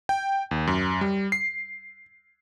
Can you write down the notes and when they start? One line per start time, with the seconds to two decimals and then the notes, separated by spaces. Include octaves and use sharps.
0.09 G5
0.51 D#2
0.67 F#2
1.01 G3
1.32 C7